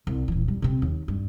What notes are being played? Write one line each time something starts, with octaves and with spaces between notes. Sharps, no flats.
C2
D#1 E3
G3
C3 C4
D#2
G2